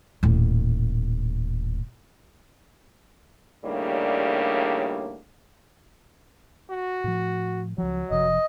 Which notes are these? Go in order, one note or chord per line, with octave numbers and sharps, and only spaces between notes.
D#1 A2
D#2 A2 C#3 G3 A#3 D4
F#4
A2 F3
C#2 F3 F#3
F#1 C3 F3 D#5